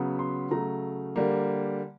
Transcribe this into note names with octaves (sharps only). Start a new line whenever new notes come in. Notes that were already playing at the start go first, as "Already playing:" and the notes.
Already playing: C#3 F#3 B3
C6
C#3 F#3 A3 A#5
D3 G3 A#3